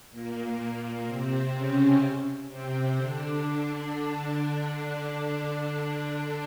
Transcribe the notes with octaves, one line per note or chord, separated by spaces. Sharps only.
A#2 A#3
C3 C4
C#3 C#4
C3 C4
D3 D4
D3 D4